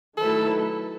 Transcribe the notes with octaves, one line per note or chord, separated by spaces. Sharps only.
D#3 F#3 A3 E4 A4 B4